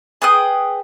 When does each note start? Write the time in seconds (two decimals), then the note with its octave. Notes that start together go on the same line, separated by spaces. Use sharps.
0.22 G#4 B4 G5 D#6